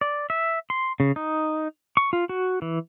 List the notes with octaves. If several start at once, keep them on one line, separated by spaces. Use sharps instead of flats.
D5
E5
C6
C#3
D#4
C#6
F4
F#4
E3